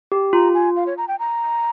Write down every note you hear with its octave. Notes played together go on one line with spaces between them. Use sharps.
G4
F4 A#5
G#5
F5
C#5
A#5
G5
A#5